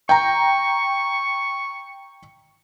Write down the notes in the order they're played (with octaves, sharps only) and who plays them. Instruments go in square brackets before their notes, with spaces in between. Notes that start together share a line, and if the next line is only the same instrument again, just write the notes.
[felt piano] G5 A#5 [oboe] C#6